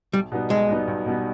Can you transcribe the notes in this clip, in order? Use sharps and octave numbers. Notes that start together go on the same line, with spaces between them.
B1 G3
B2 G3 B3 D#4
B1 G#3
B2 G3 B3 D#4
B1
B2 G3 B3 D#4